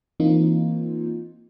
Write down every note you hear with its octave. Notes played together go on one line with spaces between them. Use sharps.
E3 A#3 C4 D#4 F4